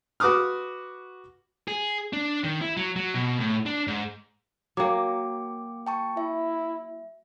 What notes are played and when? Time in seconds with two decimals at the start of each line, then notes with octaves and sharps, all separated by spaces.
0.20 F#4 B4 D6 D#6 F6
1.68 G#4
2.13 D4
2.44 D#3
2.62 E4
2.77 F#3
2.96 F#3
3.14 B2
3.40 A2
3.66 D4
3.87 G#2
4.77 F#3 A#3 G5 D6
5.87 G5 A5 C#6
6.17 E4 E5